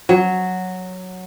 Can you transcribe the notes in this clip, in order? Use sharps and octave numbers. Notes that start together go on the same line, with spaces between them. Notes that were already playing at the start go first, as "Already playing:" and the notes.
F#3